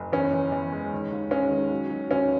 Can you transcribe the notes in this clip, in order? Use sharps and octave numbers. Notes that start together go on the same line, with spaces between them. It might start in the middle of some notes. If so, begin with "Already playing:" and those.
Already playing: F#1
E2 C#4
E2
E2
G#3
D#3
D#2
G#3 C#4
D#3
F#3
F#3
D#2 C#4